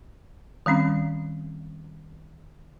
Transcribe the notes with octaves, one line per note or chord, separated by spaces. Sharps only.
D#3 G3 C4 C#4